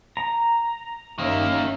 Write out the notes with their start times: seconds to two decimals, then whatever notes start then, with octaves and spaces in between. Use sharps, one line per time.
0.17 A#5
1.18 G1 D#3 A#3 C#4 E5